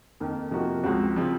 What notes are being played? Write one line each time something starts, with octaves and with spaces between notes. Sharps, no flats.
F2 D#3 A#3
C3 F3 A#3 D#4 F#4
C#2 C#3 F3 C4 F#4
C#3 F3 C4 F4